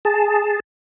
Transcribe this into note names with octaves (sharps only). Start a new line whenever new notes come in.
G#4 A5